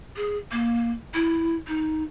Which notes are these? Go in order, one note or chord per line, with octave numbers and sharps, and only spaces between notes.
G#4
A#3
E4
D#4